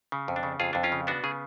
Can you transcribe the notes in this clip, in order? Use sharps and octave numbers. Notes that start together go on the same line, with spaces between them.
C#3
F2
D4
C#3
F2 F4 G#4
F2 D4
C#4 F4
C#3
B3 D4 F#4
C#3 G#4